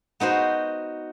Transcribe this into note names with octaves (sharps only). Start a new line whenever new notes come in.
B3 D#4 F#4 C5